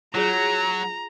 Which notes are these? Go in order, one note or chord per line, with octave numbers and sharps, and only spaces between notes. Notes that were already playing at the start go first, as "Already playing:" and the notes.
F#3 F4 G#4 C#5 A#5